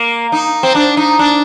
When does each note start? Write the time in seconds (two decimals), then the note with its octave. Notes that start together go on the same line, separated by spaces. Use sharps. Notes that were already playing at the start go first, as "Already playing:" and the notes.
Already playing: A#3
0.32 D#4
0.63 C4
0.75 D4
0.97 D#4
1.19 D4